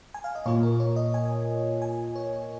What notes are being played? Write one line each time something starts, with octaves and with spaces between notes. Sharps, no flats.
G#5
F5
D#5
A#2 A#3 F4 C#5
A#4
C#5
D#5
G#5
G#5
C#5